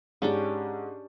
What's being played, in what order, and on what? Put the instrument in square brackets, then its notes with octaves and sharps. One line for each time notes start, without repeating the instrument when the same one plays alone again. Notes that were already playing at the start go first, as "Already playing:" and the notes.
[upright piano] G#2 [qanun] C#4 D4 G4